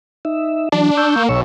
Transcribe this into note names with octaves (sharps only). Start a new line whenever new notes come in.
D#4 E5
E3 F#3 D4
C#6 E6 G6
A#3
B1 C#5 C#6 E6